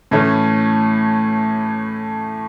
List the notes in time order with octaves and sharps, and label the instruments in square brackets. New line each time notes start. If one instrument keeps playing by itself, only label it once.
[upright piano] A2 E3 A3 C#4